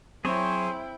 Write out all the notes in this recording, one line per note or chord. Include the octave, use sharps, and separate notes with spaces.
F#3 C4 E4 G#4 C5 C#5 G5